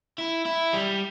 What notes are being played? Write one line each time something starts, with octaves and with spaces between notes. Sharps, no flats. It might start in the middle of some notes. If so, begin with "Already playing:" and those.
E4
E4
G3